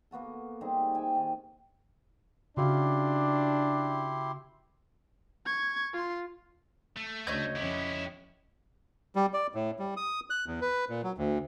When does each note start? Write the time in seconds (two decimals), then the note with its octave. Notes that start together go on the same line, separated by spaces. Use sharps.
0.11 A#3 B3 F#4 A4
0.61 G3 C4 D#4 G#4
0.94 E5 G5 G#5
1.15 D#3
2.57 C#3 D4 E4 F#4 G4 F5 C6
5.46 C#6 G#6
5.93 F4 C6
6.97 A3
7.27 D2 C#3 C#5 D#5 G6
7.56 F2 C#4 E4 G4
9.15 G3
9.33 D5
9.55 A2
9.79 G3
9.97 D#6
10.30 F#6
10.47 E2
10.61 B4
10.89 A#2
11.03 F#3
11.18 D2